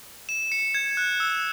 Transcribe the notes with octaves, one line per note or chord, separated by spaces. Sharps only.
E7
C#7
G#6
F#6
E6